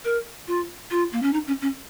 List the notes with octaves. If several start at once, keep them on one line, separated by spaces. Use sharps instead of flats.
A#4
F4
F4
A#3
C#4
D#4
C#4
C#4